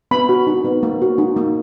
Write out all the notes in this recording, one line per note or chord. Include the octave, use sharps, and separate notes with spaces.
B3 B5
F#4
D#4
B3
A#3
F#4
D#4
A#3